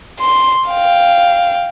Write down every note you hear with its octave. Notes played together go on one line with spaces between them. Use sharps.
C6
F5 G5